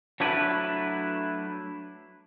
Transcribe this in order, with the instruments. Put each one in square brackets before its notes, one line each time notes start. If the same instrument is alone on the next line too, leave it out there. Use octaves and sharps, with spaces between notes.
[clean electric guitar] F#3 A3 D4 E4 B4